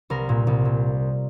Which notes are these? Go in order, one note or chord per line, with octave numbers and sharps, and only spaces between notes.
C2 A#4
A#2
C2
A#2